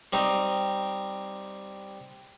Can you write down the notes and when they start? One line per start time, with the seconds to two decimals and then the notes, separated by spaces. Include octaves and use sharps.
0.13 G3 C4 D#4 G4